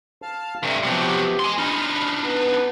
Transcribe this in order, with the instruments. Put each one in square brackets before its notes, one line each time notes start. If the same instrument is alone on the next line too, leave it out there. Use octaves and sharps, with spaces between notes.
[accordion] F5 A5 F6
[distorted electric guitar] G2 C3 [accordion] A3
[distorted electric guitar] C3 F#3 [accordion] F3 B3 G4
[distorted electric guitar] G#5 C6
[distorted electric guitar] D4 D#4 [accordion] B5 F6
[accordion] B3 B4